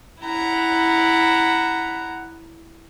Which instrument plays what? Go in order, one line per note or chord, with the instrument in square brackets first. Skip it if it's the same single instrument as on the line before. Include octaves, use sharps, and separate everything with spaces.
[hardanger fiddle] E4 A#5 [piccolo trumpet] F#5